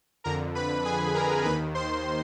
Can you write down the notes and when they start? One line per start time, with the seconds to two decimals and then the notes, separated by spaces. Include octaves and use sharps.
0.24 F2 D3 A#4 A#5
0.55 B4 B5
0.85 G#4 G#5
1.15 A#4 A#5
1.44 D#2 D#3 B4 B5
1.75 C5 C6